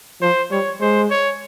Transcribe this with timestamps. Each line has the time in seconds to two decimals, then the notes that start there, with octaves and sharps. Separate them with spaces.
0.21 F3 C5
0.51 G3 C#5
0.80 G#3 C5
1.10 C#5